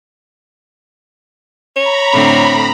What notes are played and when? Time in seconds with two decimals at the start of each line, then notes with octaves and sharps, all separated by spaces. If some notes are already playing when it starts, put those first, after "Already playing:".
1.76 C#5 A#5 B5
2.13 A2 D3 C4